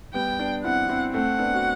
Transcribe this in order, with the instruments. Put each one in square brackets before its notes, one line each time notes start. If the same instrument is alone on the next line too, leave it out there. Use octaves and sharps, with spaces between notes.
[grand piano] G3 B3 [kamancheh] G5
[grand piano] B3 D4
[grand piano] C4 E4 [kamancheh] F#5
[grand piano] C4 E4
[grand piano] A3 C4 [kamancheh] F#5
[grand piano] B3 D4
F#4